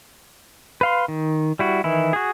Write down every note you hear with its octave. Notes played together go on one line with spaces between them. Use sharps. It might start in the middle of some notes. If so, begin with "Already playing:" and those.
B4 F5 C6
D#3
G3 E4 F#4
D#3 E3 E4
F#4 G#4